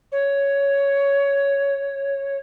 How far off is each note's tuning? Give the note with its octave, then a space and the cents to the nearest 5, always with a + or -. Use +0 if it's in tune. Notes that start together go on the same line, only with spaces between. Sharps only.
C#5 +5